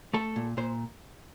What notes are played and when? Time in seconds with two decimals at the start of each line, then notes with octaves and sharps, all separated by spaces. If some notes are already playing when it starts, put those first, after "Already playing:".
0.14 A3 A4
0.36 A#2
0.57 A#2 C5